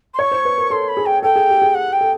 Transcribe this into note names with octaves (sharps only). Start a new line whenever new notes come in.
C6
C#5 C#6
C5
B4
A#4
A4 C6
B5
G#4
G5
A4 G5
G#4
G4
G#4
F#5
G5
A4